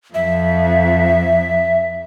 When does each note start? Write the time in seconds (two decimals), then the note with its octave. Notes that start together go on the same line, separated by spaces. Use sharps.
0.14 F2 E5